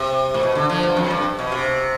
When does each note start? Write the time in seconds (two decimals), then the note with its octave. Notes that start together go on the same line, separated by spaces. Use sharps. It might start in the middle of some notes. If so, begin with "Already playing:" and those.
Already playing: C3
0.34 A2
0.43 B2
0.55 D3
0.69 D3 F3
0.83 G2
0.97 F2
1.11 G2
1.39 B2
1.52 C3